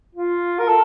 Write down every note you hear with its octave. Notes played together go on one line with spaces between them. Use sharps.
F4
A#4
A4